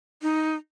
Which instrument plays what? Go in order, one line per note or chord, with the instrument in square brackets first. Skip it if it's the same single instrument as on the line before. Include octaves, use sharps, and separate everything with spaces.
[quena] D#4